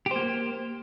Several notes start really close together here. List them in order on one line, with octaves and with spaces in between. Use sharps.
G4 C5 A#3